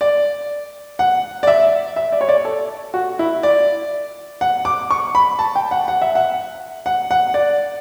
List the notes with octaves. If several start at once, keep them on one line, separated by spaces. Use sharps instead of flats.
D5
F#5
D5
E5
E5
D5
C#5
D5
A4
F#4
E4
D5
F#5
D6
C#6
B5
A5
G5
F#5
F#5
E5
F#5
F#5
F#5
D5